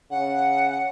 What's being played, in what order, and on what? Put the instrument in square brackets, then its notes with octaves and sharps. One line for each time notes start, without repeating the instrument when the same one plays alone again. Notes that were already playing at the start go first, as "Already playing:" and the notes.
[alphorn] C#3 [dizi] F#5